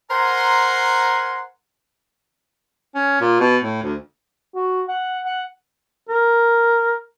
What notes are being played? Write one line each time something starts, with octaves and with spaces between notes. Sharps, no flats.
A#4 C5 F#5 G#5 A#5 C6
C#4
A#2
B2
A2
D2
F#4
F#5
F#5
A#4